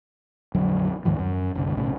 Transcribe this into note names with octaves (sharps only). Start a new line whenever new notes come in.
A#1 F2 D3 F#3
D2 G#2 D#3 F3
F#2
F#1 C2 D3
B1 A2 C#3